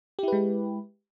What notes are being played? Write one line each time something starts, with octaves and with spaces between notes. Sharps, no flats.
G#3 E4 G4 B4